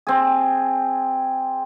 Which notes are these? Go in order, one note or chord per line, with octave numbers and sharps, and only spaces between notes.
C4 G#4